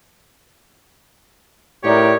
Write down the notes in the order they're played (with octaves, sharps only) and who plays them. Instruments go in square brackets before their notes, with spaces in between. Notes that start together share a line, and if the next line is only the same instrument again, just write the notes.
[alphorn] A2 [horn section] D#4 G4 C#5 [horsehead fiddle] A#4 D5